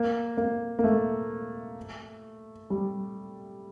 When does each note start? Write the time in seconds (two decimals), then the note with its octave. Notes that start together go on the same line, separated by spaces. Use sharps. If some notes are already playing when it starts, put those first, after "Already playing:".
Already playing: A#3
0.37 A#3
0.79 A#3
0.84 A3
2.70 G3